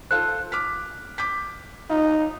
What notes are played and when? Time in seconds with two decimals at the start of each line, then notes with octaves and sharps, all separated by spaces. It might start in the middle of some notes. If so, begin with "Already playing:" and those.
0.11 F4 A4 C5 F#6
0.52 D6 F6 B6
1.18 D6 G6 B6
1.90 D#4 F4